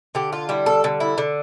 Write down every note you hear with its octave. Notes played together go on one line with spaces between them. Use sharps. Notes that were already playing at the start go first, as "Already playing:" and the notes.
D3 G4
F4
G3 E4
A4
D3
E4
D3